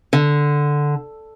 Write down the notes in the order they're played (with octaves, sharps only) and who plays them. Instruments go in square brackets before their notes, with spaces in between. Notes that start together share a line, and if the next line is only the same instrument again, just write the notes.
[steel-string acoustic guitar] D3